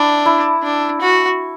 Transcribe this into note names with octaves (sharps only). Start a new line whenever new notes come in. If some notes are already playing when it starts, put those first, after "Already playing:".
Already playing: D4 E4
E4
D4
F#4